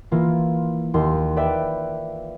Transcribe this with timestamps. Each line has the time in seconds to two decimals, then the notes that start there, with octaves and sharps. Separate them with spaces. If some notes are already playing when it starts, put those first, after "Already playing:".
0.12 E3 A#3 F4
0.94 D#2 C6
1.36 B4 D5 E5 G5